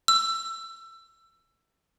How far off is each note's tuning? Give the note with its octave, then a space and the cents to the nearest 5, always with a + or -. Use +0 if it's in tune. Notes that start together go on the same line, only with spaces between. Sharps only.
E6 +20